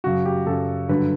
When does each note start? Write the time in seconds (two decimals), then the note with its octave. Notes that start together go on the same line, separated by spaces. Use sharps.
0.04 F#2 C#3 F#3 F#4
0.25 G4
0.46 F#2 C#3 F#3 A4
0.89 G2 D3 F#3 B4